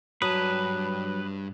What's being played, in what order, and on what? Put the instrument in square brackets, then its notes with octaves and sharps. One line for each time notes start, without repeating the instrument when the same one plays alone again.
[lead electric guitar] G2 A5 [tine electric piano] F#3 D#6 [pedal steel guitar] B4